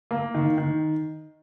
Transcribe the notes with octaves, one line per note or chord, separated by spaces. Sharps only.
A#3
D#3
D#3